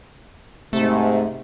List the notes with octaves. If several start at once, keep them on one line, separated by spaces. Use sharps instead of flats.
G#2 C3 A3